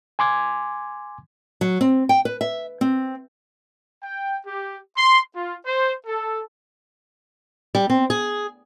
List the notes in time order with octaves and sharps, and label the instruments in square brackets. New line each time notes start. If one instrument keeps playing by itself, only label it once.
[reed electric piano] G#5 C6 D6 G#6
[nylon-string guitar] F#3
C4
G5
B4
E5
C4
[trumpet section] G5
G4
C6
F4
C5
A4
[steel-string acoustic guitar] G3
C4
G#4